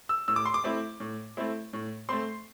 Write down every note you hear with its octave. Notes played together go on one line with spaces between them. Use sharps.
E6
A2 E6
D6
C6
D6
A3 C4 E4
A2
A3 C4 E4
A2
A3 C4 C6